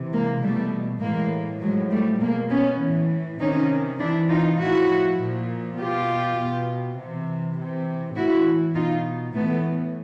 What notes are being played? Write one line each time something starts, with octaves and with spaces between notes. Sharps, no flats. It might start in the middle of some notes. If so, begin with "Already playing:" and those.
Already playing: C3 E3
G#3 A#3
B2 G3 A3
A2 E3 G#3 A#3
A2 F3 F#3 G#3
G3 A3
B2 G#3 A#3
B3 C#4
A2 E3
C3 D#3 C#4 D#4
C3 E3 D4 E4
D#4 F4
A2 F3 E4 F#4
A#2 F3
B2 F4 G4
B2
C3 E3
C3 E3
A2 E3 E4 F#4
B2 D#4 F4
A2 E3 A3 B3